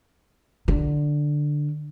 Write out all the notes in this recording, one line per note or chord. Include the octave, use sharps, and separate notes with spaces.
D3